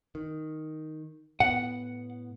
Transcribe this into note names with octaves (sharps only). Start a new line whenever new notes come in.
D#3
A2 B3 F#5